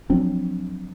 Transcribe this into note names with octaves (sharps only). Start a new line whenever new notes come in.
F3 F#3 C4 D4